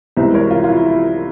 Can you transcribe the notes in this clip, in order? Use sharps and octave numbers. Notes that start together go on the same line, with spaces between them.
C2 C3 E3 G#3 C5 E5
A#4 C#5
F4
F4
E4
E4